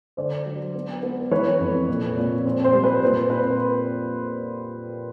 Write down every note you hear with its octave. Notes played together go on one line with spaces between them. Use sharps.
D3 C5 D5
F#3
B3
B3
E3 B4 C#5
F2
A#2
A#2
C4
C5
G3
B4
A#2 C5
C4 B4